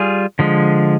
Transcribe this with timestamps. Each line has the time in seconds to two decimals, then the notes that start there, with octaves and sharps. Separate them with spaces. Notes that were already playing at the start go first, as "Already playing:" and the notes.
Already playing: G3 F4 G#4
0.39 D3 F3 G#3